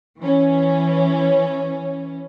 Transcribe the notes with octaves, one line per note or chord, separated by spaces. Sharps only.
E3 C#4